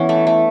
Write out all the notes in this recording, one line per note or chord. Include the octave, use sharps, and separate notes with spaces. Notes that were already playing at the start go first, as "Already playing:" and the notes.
Already playing: E3 B3 C#4
A3
A3